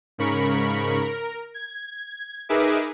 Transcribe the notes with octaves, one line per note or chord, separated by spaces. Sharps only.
G#2 C#3 A#4 B5 C#6
A#4
G#6
D#4 G#4 A#4 B4 E5 D6